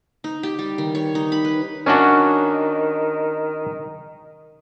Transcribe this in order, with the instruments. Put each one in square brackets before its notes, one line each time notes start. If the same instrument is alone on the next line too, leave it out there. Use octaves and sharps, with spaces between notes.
[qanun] D#4
G4
G3
D#3
C#5
D#4
B5
B4
[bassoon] D#3 [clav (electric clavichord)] C#4 D4 F#4